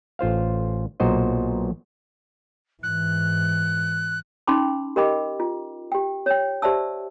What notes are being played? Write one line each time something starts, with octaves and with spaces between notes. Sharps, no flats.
A1 F4 C5 F5
B1 A#2 F#4 C5 D#5
G#2 E3 F#6
C#4 D#4 G5 B5 C6 D6
G4 A#4 D#5 G5 B5 D6
F4
G4 G5
C#5 G5
G4 C5 D5 E5 A5 E6